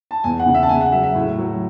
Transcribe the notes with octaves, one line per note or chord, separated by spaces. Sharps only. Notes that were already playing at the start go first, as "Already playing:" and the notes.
A5
E2 G#5
F#5
C#3
E5
A5
C#3 G#5
F#5
F#3 E5
E5
A2
F#3